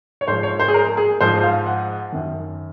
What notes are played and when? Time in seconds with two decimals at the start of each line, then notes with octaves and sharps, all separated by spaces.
0.21 C#5
0.28 G#2 F3 C5
0.43 C#5
0.60 C5
0.68 G#4
0.74 A#4
0.97 G#4
1.21 G#2 F3 C5
1.43 F5
1.66 F#5
2.12 F#2 D#3